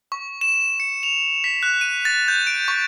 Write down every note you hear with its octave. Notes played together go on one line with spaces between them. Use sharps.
C#6
E7
C#7
F7
B6
F#6
D#7
A6
G6
D7
C#6